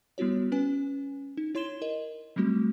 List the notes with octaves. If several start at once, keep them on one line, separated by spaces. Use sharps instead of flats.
G3 B3 E4 F#4 C#5
C#4 B4 G#5
D#4
E4 C#5 C6 G#6 E7 G7
A#4 D#5
F#3 G3 A3 C4 F#4